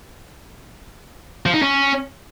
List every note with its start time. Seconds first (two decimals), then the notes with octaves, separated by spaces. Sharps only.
1.46 F3
1.54 D#4
1.62 C#4